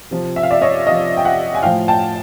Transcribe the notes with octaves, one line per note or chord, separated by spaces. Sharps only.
C3 F3
E5
F5
D5 E5
C#5 D#5
C3 F3 D#5 F5
G5
E5 F#5
G#5
A2 F3 F5 G5
G5 A5